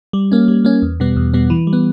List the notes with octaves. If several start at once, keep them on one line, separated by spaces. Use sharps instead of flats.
G3
A#3 C#4
G3
A#3 C#4
E2
B2 G3 B3
E2
B2 G3 B3
E3
G3
B3